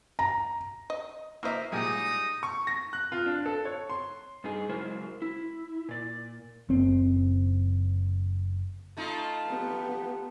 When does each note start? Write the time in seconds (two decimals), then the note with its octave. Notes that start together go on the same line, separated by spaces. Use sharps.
0.19 A#5
0.90 D#5
1.43 E3 A#3 C5 D#5 E5
1.72 A#2 G3 G#3 D#4 D#6
2.43 C#6
2.67 A#6
2.93 F#6
3.12 F4
3.26 D4
3.46 A4
3.65 C#5
3.90 C6
4.44 G2 D#4 G#4
4.69 C#3 F#3 G#3 E4 A#4 C5
5.22 E4
5.89 A#2 D5
6.69 F#1 C4
8.97 A3 D#4 F4
9.49 B3 G4